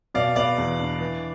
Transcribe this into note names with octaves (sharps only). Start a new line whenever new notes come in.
B2 D5 F5
B3 D5 F5
E2
D4
E3